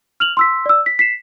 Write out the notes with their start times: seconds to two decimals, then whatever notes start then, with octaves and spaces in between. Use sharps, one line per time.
0.20 F6 F7 F#7
0.37 C6 E6 B6
0.66 D5 E6
0.86 B6
0.99 B6 C7 E7